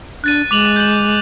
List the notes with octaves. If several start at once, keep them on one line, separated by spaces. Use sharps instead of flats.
D4 F#6 A6 D#7
G#3 D6 F7 F#7
G6 F#7